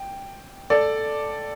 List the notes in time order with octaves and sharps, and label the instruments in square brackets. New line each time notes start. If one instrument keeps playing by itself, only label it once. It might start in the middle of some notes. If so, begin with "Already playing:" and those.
Already playing: [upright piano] G5
A4 D5